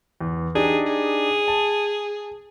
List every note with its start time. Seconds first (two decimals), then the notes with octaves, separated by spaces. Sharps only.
0.21 E2
0.55 D4 D#4 G4 G#4
0.86 G#4
1.48 A5